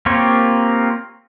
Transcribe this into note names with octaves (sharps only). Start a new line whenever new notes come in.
A#3 C4 F4 G4 C#5